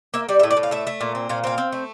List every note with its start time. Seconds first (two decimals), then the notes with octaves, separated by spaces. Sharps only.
0.14 A#3 E5
0.29 G3 D5
0.40 A2 E5
0.51 D5
0.57 A2
0.63 F5
0.71 A3 E5
0.87 A3
1.01 A#2
1.15 C4
1.29 A#2 F5
1.44 C4 F5
1.58 C4
1.72 A3